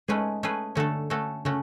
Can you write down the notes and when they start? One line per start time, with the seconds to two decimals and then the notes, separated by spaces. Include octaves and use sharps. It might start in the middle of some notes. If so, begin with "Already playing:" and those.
0.08 G#3 A3 C#4 G#4 B4
0.43 A3 C#4 G#4 B4
0.75 D3 A3 C#4 F#4 A4
1.10 A3 C#4 F#4 A4
1.45 C#3 A3 C#4 F#4